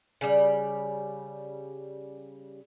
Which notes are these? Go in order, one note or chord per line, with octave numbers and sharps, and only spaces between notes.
C#3 G3